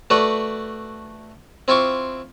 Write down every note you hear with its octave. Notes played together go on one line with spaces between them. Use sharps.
A3 F#4 B4 D5
C4 E4 F4 C#6 D6